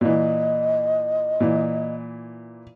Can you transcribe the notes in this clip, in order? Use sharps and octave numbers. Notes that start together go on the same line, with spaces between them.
A#2 E3 D#5
A#2 E3